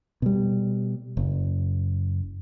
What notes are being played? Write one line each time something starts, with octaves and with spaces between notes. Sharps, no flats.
B2 G3
F#1